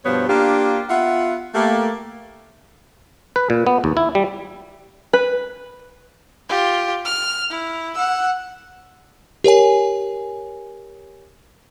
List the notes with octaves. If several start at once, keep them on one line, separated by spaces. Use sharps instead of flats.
G2 B2 F3 B3 C5 C#5
A#3 D4 F4 G4
B3 F4 E5 F#5
A3 A#3 G4
B4
A#2
B3
D#2
E4
G3
B4
F4 G4
F6
E4
F#5 E6
G4 A#4 C#5 G#5